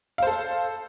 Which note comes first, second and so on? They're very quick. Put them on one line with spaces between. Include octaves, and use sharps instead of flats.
F5 C5 A4